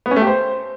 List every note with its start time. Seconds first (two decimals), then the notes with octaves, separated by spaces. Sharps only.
0.06 B3
0.11 C#4
0.16 A3
0.22 G4
0.27 C5